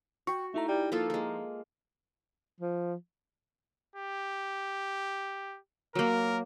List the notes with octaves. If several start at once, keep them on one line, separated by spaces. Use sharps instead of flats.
F#4 G5 C#6
A3 D#4 E4 A#5
G3
F3 A#3 F4 A4
G#3 A#3
F3
G4
F#3 A#3 A#4